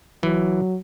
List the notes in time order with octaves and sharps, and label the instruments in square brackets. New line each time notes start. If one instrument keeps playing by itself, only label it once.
[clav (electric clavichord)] E3 [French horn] F#3